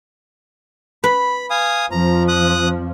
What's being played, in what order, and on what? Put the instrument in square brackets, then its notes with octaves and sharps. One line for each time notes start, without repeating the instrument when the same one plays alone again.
[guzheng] B4 [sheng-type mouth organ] B5
[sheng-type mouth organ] F5 G#5 D#6
[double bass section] F2 F3 [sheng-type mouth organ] A#5
[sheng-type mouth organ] D#6 F#6